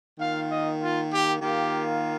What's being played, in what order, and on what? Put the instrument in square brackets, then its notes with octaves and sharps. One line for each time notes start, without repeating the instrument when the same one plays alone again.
[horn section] D#3 A#3 F4 F5
D#5
F4
G4
D#3 A#3 F4 G4